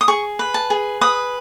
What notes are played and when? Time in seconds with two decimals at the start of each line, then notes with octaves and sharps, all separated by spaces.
0.01 D#6
0.08 G#4 C#6
0.39 B4
0.54 A5
0.70 G#4
1.01 B4 D#6